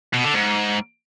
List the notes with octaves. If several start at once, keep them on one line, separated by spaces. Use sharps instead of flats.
B2
D3
G#2